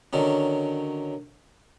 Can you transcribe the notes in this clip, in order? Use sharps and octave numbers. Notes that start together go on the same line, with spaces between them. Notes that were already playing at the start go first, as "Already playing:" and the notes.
D3 D#3 F#3 C#4